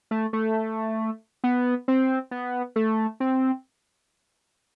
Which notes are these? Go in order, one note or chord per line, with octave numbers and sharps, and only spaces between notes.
A3
A3
B3
C4
B3
A3
C4